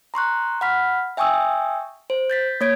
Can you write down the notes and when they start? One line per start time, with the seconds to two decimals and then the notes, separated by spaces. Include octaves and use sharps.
0.14 A#5 C6 C#6 F#6
0.61 F#5 B5 F6 B6
1.17 E5 G5 G#5 C#6 D#6 E6
2.10 C5
2.30 G6 A6 B6
2.61 A#3 C#5 G#6 D7